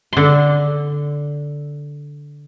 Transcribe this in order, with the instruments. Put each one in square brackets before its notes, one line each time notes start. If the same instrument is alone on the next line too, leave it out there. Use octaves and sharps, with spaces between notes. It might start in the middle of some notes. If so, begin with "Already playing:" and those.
[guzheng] D3 C6